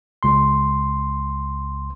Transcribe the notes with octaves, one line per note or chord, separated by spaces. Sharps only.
C#2 C6